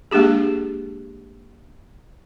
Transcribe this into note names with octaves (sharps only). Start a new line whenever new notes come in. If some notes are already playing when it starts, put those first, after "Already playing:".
G#3 A#3 D4 G4 G#4